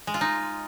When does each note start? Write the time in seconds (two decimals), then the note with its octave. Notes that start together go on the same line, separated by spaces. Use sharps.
0.07 G#3
0.14 F4
0.21 D#4